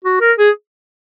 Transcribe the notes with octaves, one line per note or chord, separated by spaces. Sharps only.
F#4
A#4
G#4